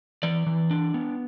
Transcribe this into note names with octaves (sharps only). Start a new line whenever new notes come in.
E3 D5
E3
D4
B3